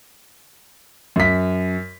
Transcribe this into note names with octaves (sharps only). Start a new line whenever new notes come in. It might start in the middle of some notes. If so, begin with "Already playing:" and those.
F#2 B6